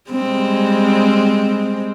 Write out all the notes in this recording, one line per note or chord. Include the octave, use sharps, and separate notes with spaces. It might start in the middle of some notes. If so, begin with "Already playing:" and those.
G3 G#3 C4